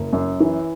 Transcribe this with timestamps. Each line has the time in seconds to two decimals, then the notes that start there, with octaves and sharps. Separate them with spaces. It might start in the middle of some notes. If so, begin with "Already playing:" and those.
Already playing: F#1
0.13 F#2
0.40 E3